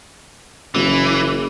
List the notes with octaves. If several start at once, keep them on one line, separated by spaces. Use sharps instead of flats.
F#1 E3